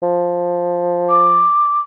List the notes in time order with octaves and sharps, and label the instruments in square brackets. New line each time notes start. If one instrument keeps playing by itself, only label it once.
[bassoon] F3
[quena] D6